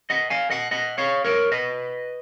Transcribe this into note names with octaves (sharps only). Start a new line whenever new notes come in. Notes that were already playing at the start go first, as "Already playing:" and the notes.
D#5 F#5
F5 G#5
D#5 F#5
D#5 F#5
C#5 F5
A#4 C#5
B4 D#5